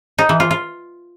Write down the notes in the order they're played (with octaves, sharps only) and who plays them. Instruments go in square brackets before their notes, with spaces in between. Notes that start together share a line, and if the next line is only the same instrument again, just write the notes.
[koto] D#4
E3
F4
F4